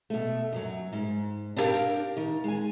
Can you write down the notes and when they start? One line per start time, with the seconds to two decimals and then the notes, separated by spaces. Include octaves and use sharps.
0.10 B2 A3
0.52 F#2 E3 F#3
0.93 G#2
1.56 D4 E4 G4 A#4 F5 G5
2.17 D#3
2.44 G#3 G#5